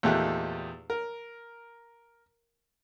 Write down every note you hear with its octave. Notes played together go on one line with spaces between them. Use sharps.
E2 A#2 A3 D#4 G4 F#6
A#4